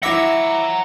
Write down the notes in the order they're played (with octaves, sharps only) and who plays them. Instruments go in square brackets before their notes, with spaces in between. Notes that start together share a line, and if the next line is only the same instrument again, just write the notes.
[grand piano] E4 D6 A#6 [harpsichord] E5 [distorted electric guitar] F#5 A#5